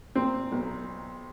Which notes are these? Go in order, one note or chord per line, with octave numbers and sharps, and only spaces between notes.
A#2 C4
B1